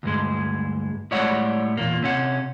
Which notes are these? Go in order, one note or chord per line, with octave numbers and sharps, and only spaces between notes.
D2 G2 G#3
A2 G3 G#3 C#5 D5 F#5
E2 A#2 A#3
C3 C#4 F#5